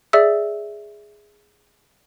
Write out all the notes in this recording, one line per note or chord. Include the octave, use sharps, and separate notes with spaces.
G#4 D5 E5 E6